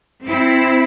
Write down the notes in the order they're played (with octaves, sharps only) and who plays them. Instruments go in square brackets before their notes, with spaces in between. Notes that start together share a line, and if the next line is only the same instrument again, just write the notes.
[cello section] C4 E4